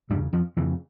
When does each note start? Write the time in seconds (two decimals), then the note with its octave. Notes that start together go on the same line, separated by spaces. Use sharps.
0.10 E2 G2 G3
0.15 C#3
0.33 F2 F3
0.57 F2 C#3 E3